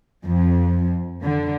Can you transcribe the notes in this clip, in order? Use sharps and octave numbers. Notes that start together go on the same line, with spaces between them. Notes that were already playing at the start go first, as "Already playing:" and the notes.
F2
D3